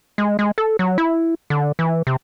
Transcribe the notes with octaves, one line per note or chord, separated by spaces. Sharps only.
G#3
G#3
A4
F#3
E4
D3
E3
C3